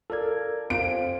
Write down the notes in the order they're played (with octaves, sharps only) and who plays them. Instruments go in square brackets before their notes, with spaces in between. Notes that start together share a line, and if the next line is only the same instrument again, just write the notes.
[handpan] F4 D5 [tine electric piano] A4 A#4 G#6
[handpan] C4 F4 [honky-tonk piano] D7